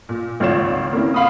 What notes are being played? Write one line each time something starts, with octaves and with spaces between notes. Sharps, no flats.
A#2
G#1 C#2 F4 C#5 D5 E7
A#3 C4 C#4 E4
F5 B5 C6 D#6